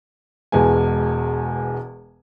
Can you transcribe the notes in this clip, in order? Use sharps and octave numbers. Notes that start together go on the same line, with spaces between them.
E1 E2 G#3 B3 G#5